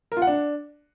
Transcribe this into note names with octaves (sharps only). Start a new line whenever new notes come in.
A#4
F4
F#5
D4